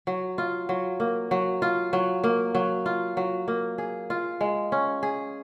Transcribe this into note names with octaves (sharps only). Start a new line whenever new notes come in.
F#3
F4
F#3
A#3
F#3
F4
F#3
A#3
F#3
F4
F#3
A#3
G#4
F4
G#3
C#4
G#4